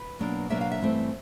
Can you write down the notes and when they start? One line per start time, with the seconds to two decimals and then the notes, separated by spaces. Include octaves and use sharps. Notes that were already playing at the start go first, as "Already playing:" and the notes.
Already playing: B4
0.19 B2 F#3 A#3 D4
0.50 B2 F#3 A#3 D4 E5
0.61 F5
0.72 E5
0.82 G2 E3 A3 C4